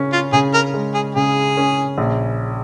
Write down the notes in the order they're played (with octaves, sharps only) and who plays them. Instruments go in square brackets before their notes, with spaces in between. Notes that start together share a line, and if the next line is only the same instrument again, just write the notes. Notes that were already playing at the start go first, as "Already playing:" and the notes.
Already playing: [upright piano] C#3 C#4
[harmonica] F4
[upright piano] C#3 [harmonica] G#4
[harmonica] A#4
[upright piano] G#3
[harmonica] G#4
[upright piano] C#3 [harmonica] G#4
[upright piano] C#4
A#1